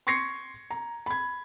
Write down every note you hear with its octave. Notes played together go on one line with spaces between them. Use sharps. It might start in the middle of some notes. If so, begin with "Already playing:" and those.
C6 C#6 G#6 A#6 C7 C#7
A#5
B5 G#6